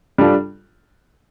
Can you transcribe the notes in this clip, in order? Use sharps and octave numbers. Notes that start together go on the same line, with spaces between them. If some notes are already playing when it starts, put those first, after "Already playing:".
G3 D4 F4 A4